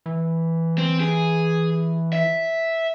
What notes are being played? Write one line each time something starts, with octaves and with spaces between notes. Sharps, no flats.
E3
C4
G#4
E5